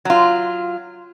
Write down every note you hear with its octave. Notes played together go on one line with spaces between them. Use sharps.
F#3 F4